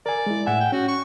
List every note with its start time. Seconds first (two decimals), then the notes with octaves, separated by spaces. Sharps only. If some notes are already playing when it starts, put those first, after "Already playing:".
0.06 A#4 D5 G#5
0.26 G#3 E4
0.46 A2 E5 F#5 G#5
0.60 G5
0.72 C#4 F#4
0.88 C#6